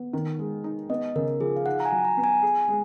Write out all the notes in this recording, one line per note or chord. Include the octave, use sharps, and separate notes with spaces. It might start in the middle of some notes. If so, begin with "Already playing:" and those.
Already playing: B3
D#3
G#3
D#4
B3 D#5
C#3 A#4
F3 G#4
F5
D#4 F#5
A#5
G#5
F#3
A#5
B3
G#5
G#4
G#3